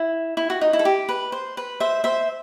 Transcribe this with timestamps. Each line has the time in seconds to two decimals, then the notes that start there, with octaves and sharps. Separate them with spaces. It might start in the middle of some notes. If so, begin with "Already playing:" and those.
Already playing: E4
0.37 E4
0.50 F#4
0.61 D#4
0.73 E4
0.79 A4
0.85 G4
1.09 B4
1.32 C5
1.57 B4
1.80 C5 E5
2.04 C5 E5